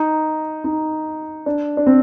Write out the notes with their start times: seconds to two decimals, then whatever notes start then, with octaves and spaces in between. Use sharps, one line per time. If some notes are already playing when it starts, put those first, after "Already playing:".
Already playing: D#4
0.64 D#4
1.46 D4
1.77 D4
1.87 C4